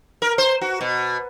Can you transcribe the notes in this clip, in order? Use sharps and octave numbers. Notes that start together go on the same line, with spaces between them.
A#4
C5
F#4
B2